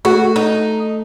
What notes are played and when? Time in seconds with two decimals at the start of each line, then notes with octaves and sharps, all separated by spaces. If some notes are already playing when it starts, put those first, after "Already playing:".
0.05 A3 F#4
0.36 D#4